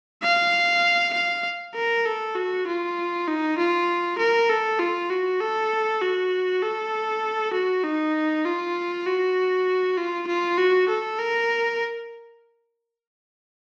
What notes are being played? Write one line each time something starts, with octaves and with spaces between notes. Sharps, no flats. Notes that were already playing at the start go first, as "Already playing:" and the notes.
F5
F5
A#4
A4
F#4
F4
D#4
F4
A#4
A4
F4
F#4
A4
F#4
A4
F#4
D#4
F4
F#4
F4
F4
F#4
A4
A#4